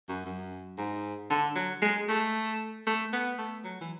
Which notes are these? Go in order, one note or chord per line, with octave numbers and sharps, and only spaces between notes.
F#2
F#2
G#2
D3
F#3
G#3
A3
A3
B3
A3
F#3
E3